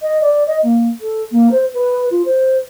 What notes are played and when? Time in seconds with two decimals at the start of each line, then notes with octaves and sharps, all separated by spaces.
0.01 D#5
0.21 D5
0.47 D#5
0.63 A#3
1.00 A4
1.31 A#3
1.51 C5
1.73 B4
2.10 F4
2.25 C5